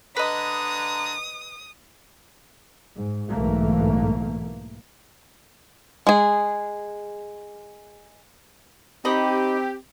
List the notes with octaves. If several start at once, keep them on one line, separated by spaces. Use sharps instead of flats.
D3 B4 D#5 A#5 D#6
G#2
B1 G#2 E3 A3 A#3
G#3 G#4
C4 D#4 G4 D#5 B5